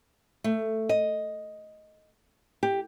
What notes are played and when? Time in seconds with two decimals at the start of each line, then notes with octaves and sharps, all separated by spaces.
0.44 A3
0.89 D#5
2.63 G4